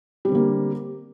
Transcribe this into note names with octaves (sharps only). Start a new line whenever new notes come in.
D3 G3 A#3 C4